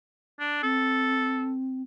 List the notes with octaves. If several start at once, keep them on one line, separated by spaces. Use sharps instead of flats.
D4
C4 A4